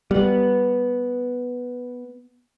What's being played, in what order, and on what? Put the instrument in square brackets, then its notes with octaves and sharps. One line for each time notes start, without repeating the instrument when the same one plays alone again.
[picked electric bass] G3 [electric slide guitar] B3 B4